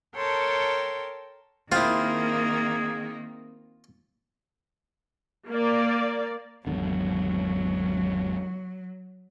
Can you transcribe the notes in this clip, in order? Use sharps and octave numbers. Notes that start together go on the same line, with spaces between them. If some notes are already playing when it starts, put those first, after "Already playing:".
A4 A#4 C#5 G5 A5 C6
D#3 A#3 C4 E4 F4 G#4
A#3 D5
G#1 E2 D3 F#3